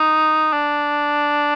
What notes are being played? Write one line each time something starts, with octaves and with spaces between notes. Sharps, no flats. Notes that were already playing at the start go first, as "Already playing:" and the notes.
Already playing: D#4
D4